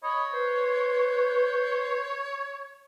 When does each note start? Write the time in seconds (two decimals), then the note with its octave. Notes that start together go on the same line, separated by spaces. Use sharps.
0.03 C#5 D#5 B5
0.33 B4 C5